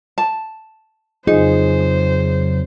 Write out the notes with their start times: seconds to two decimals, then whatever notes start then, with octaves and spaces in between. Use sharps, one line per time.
0.18 A5
1.27 F2 C#3 F#3 D#4 F4 G#4 C5